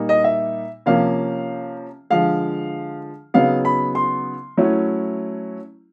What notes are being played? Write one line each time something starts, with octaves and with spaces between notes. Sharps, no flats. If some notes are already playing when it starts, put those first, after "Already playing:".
Already playing: A#2 G3 A#3 D#4
D#5
E5
C3 F3 A#3 C#4 F5
D3 F3 G#3 F5
C#3 F#3 B3 D#4 F5
B5
C6
F#3 A3 C#4 E4